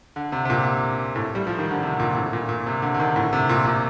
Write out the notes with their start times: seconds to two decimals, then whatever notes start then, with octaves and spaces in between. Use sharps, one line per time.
0.16 D3
0.32 C3
0.45 C3
0.50 A#2
1.16 A2
1.35 G3
1.47 F3
1.58 D#3
1.71 D3
1.83 C3
2.00 A#2
2.17 A2
2.33 A#2
2.49 A#2
2.66 C3
2.82 D3
2.94 D3
2.99 D#3
3.16 A2
3.33 C3
3.49 A#2
3.66 A#2